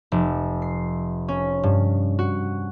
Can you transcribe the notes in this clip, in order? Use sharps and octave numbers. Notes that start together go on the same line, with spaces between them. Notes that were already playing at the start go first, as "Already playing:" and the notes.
F1
C7
C#4
G2
F#4